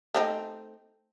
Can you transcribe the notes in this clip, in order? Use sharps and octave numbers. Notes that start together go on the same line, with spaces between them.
A3 C4 D#4